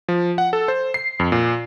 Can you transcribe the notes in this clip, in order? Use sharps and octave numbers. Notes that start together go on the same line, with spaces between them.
F3
F#5
A4
C5
C7
F2
A#2